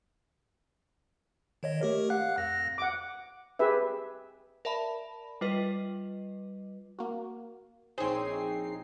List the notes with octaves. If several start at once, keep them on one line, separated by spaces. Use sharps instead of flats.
D#3 C#5 D#5
A3 G4 A#4
F5 F#5 F#6
F2 A#6
F#5 D6
G4 G#4 B4 E5
A#4 D5 E5 A5 B5
G3 F4 B4 D#5
A#3 F#4
A#1 C4 D#4 G#4 C5 C#5 C7